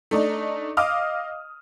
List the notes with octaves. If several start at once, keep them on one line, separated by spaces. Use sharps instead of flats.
A3 D4 D#4
D#5 F5 D6 D#6 F6